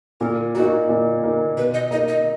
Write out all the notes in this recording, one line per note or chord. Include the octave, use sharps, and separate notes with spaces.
A#2 A#4
A#3 D#4 F#4
A#2
A#3 D#4
B2 B4
D#5
A#3 D#4 D#5
D#5